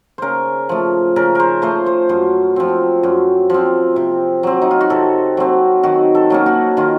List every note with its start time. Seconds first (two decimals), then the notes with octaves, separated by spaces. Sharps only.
0.18 C#3 A#4 C5
0.69 F3 A3
1.16 C#3 A#4
1.35 A#4 C5
1.62 F3 A3 C5
1.86 C5
2.09 F#2 C5
2.56 F3 C4
3.03 F#2
3.50 F3 C4
3.96 C3
4.43 F#3 C4
4.62 D#4
4.71 F4
4.81 F#4
4.90 C3 A4
5.37 F#3 C4
5.83 D#3 F#4
6.15 A4
6.30 F#3 A#3 C#4
6.46 F#4
6.77 D#3 F4